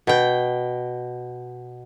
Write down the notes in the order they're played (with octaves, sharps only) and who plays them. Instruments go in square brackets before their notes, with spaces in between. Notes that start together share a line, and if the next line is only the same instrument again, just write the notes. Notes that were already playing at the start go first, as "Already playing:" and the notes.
[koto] B2 G5